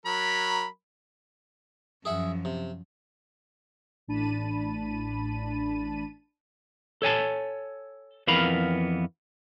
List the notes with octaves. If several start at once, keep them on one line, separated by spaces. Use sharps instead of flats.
F#3 A#4 B5
F#2 F3 G#4 E5 F#5
C3
A1 A2 D4 A5 B5 D#7
A4 C#5 G#5 A5
F2 E3 B3 A#4 F5 B5